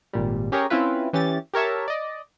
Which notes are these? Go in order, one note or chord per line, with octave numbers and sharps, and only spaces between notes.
G#1 A#2 G3
C#4 G4 G#4 A#4 C#5
C4 C#4 E4 F4 B4
E3 C#4 G4 A6
G4 A#4 C#5 E5 A5
D5 D#5